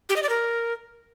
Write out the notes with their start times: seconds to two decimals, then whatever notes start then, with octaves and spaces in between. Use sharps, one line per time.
0.09 G4
0.16 D#5
0.23 D5
0.29 A#4